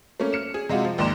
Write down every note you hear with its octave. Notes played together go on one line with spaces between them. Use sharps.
A3 A#3 C#4
F6 C#7 E7
G#4
C3 G#3 F4 F#4
F3
A#1 D#2 G#2 D5 C6 E7